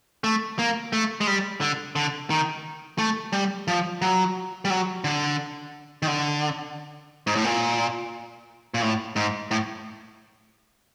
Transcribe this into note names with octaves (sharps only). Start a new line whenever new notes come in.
A3
A#3
A3
G#3
G3
D3
D3
D#3
A3
G3
F3
F#3
G3
F#3
D3
D#3
D3
G#2
A2
A#2
A#2
A2
G#2
A2